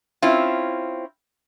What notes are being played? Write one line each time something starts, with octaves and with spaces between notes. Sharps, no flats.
C4 C#4 E4 F4